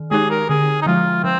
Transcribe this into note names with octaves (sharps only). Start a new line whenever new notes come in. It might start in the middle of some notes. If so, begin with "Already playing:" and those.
Already playing: D#3
G#3 D#4 G4 G#4
A#4
D3 G#4
D#4
F3 G#3 F4
F3 C4